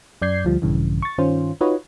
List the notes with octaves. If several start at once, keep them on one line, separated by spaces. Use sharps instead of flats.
F#2 D5 G6 G#6 C7
D2 F3 G3
A#1 G2 C#3 E3
C#6 A6
G2 D#3 C#4 F4 C5
D#4 F4 F#4 B4 C#5 D#5